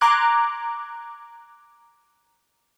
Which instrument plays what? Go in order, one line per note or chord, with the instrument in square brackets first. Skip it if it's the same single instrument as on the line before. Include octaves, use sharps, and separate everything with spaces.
[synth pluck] A#5 C6 D6 F#6 G#6